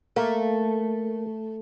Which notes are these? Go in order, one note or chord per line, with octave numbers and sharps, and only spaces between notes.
A3 A#3